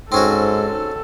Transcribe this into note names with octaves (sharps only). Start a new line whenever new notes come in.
G#2 C4 C#4 F#4 A4